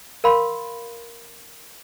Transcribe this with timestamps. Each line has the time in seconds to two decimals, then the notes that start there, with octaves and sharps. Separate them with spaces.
0.24 A#4 F5 B5 C6